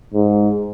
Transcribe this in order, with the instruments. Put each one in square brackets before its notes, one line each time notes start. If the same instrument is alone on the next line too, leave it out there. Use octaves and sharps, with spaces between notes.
[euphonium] G#2